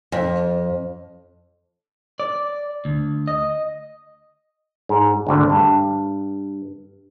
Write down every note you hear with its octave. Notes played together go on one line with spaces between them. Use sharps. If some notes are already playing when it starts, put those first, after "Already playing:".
F2
D5
D2
D#5
G#2
G#1 D2 D3
G2